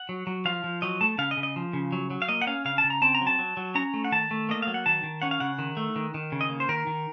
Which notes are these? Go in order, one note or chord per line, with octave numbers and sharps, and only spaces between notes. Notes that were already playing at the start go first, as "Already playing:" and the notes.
Already playing: F#5
F#3
F#3
F3 F5
F3
F#3 D#5
A3 A5
C#3 F5
D#5
C#3
D#5
F3
C#3
F#3
F#3
F5
A#3 D#5
F#5
C#4 F5
C#3 F5
A5
C#3
A#5
C4 A5
A#5
F#3
A5
F#3
F#3
C#4 A#5
A3
F#5
D#3 A5
A3
A#3 D#5
F#3 F5
F#5
D#3 A5
D#3
C#4 F#5
F5
C#3 F#5
D#3
A3
D#3
D#3
C#3
D#5
A#3
C5
D#3 A#4
D#3